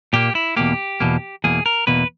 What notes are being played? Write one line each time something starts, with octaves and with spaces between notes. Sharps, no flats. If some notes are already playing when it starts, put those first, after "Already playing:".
A#2 A#3 G4
E4
E2 B2 A#3 G4
E2 B2 A#3
E2 B2 A#3 G#4
A#4
E2 B2 A#3 B4